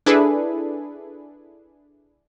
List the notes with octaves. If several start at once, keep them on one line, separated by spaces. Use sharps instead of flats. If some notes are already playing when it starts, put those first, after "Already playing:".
D4 E4 G#4 A4 B4